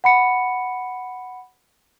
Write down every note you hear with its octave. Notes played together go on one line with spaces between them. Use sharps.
F#5 B5 C#7